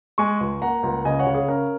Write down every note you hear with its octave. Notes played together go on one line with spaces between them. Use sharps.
G#3 G#5 C#6
C#2
A#3 F#5 A#5
C#2
C#3 D#5 G#5
C#5 F#5
C#3
G#4 C#5
C#4 A#4